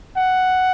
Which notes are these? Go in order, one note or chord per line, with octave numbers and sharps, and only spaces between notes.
F#5